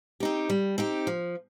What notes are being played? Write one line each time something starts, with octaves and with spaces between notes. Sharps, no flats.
C4 D#4 G4
G3
C4 D#4 G4
F3